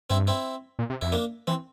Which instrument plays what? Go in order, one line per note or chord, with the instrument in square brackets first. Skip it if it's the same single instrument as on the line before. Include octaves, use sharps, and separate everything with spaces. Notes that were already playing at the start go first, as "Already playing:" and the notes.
[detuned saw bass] G2 [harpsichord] C4 E4
[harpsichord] C4 E4
[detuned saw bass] A#2
C3
[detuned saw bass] F2 [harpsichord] E4
[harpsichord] A#3 D4
[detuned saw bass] E3 [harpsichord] C4